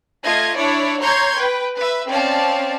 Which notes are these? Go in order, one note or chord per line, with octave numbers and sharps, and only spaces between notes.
A3 F4 D#5 G#6
D4 E4 C#5 D5
C#5 A#5 C6 C#6 G6 G#6
B4 G5
B4 E5
C4 C#4 D5 F5 A5